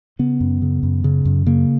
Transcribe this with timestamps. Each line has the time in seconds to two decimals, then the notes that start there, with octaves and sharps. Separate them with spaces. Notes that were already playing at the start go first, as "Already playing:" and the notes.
0.19 C#3 B3
0.40 F#2
0.62 C#3
0.83 F#2
1.04 C#3
1.25 F#2
1.46 C#3 A#3